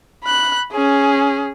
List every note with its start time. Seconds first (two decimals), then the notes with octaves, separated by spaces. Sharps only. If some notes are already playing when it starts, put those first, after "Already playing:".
0.24 B5 F#6
0.72 C#4 G#4